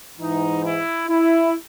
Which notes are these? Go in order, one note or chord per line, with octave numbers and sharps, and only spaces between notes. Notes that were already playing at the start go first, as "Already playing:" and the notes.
G#2 E3 D#4
E4
E4